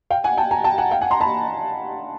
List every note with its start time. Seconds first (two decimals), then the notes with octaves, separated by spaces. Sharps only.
0.10 F5 G5
0.24 F#5 G#5
0.37 G5 A5
0.51 G#5 A#5
0.64 G5 A5
0.78 F#5 G#5
0.91 F5 G5
1.01 F#5 G#5
1.11 A#5 C6
1.21 A5 B5